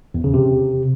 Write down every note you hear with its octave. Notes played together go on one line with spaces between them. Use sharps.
E2
C#3
C3